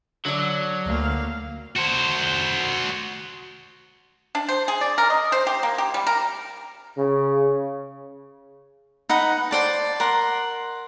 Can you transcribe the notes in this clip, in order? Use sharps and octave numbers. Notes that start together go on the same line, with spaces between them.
D3 F#3 D5
D2 A#3 F5
F#4 C5
D4
C5
G#4
D5
A#4
D#5
C5
G4
A#3
G4
G3
A#4
C#3
D#4 B4 F#5
C5 D5 A5
A#4 F#5 C6